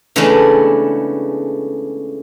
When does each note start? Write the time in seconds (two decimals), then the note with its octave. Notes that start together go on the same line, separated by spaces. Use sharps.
0.16 C#3 E3 G#3 A3 B3 D4